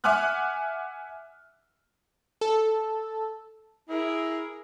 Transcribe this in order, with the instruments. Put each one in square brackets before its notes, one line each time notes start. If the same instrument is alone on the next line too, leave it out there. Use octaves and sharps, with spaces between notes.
[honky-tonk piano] E5 F#5 G#5 D6 F6 F#6
[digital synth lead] A4
[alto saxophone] E4 [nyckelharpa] G#4 A#4